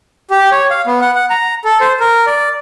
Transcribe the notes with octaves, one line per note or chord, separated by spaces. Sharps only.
G4
C#5
F5
B3
F#5
F#5
A#5
A4
C5
A#4
D5